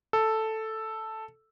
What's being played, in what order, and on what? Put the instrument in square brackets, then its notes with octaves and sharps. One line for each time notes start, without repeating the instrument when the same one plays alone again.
[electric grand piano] A4